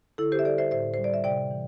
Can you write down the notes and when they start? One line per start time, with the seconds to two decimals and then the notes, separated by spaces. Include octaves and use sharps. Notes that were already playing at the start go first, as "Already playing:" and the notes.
0.18 D3 E4 A4
0.32 G4 C5
0.39 E5
0.45 G3 A4 D5
0.58 C5 E5
0.71 A2 C5 E5
0.94 G3 C5
1.04 D5
1.14 E5
1.24 C3 D5 G5
1.51 E3